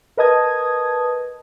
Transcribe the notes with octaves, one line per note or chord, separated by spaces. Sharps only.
A#4 B4 D#5 A5 D#6 G#6